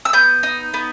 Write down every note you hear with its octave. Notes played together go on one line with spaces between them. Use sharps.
E6
B3 G6
D#4
B3